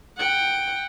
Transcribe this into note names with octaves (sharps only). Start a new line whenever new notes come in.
F#5 G5